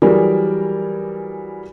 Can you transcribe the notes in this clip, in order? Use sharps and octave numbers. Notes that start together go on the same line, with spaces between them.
E3 F#3 G3 G#4 A#4 D5